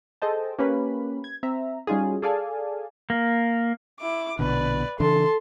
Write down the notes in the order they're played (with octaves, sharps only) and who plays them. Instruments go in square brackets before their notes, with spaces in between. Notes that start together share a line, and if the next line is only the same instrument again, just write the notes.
[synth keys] G#4 A4 C5 D#5 G5 A5
A#3 C#4 G4 B4 B5
G#6
C4 E5 A#5
G3 C#4 D#4 F4 F#4 G#4
G#4 A4 D5 F5 G#5 A5
[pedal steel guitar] A#3
[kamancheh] E4 D6
[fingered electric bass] A#1 B2 D3 [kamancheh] B4 D5
[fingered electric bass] C#3 E3 D4 [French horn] A4 [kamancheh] A5 C6